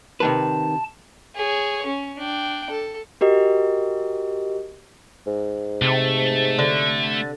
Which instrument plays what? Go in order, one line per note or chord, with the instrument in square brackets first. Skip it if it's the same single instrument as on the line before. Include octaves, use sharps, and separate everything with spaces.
[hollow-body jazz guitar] C3 D#3 B4 [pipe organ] A5
[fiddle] G#4 C#5
C#4
D4 G5
A4
[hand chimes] F#4 G4 A#4 D#5
[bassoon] G#2
[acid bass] C3 [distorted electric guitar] A3
[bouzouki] D3